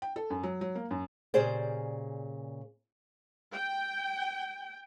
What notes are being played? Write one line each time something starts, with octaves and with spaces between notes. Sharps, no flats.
G5
A4
F#2
F#3
F#3
A#3
F#2
A#2 C#3 G4 G#4 C5 D5
G5